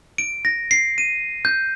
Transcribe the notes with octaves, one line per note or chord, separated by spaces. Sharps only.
D7
A#6
C7
D#7
G6